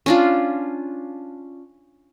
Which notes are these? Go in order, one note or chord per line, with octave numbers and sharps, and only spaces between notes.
C#4 D4 F4